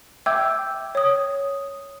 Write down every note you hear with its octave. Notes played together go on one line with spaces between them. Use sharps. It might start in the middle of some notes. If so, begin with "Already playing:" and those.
E5 G5 D6 E6 G6 G#6
C#5 D#6